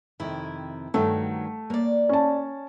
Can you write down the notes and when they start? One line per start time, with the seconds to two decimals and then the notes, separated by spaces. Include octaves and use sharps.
0.20 F2 C3 D#3 E4
0.94 G2 D#3 F#3 A3 D4
1.70 A2 A#3 D5
2.09 C#4 A5